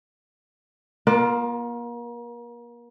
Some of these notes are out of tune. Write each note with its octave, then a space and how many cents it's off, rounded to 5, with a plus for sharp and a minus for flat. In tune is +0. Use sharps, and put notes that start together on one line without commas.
A#3 +35 F4 +0 A#4 +0